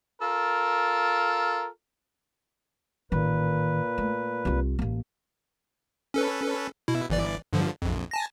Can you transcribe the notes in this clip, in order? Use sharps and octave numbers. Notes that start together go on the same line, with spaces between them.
F4 A4 A#4
A1 A#2 D#3 B4
A3
C2 F4
A1 A#3
C#4 A4 B4
B2 E4
G1 E3 D5
G2 D3 F3
A#1 F2
G#5 A5 A#6